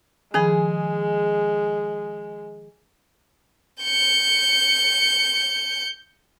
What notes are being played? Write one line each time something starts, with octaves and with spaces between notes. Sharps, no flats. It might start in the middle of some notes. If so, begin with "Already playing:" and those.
D#3 F3 G#3 G#4 B5
G6 C#7